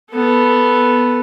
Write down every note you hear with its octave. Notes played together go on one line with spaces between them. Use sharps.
B3 A4